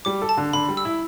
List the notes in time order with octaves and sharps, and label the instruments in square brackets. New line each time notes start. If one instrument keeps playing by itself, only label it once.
[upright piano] G3 [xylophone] D6
[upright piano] A4
[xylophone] A5
[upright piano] D3
[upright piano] D3 [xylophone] B5
[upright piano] G3
[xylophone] E6
[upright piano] E4